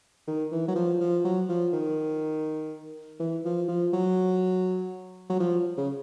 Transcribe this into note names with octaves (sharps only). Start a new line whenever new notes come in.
D#3
E3
F#3
F3
F3
F#3
F3
D#3
E3
F3
F3
F#3
F#3
F3
C#3